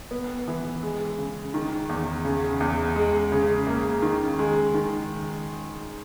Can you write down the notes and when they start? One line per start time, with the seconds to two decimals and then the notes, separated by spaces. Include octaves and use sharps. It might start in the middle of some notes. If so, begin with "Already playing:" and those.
0.11 B3
0.48 E3
0.83 G#3
1.18 C#3
1.54 D#3
1.89 E2
2.25 C#3
2.60 E2
2.96 G#3
3.32 C#3
3.67 A#3
4.02 D#3
4.39 G#3
4.74 D#3